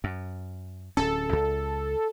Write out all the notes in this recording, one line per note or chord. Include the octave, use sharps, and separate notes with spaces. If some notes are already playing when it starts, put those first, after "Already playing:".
F#2
D1 C#4 A4
C#2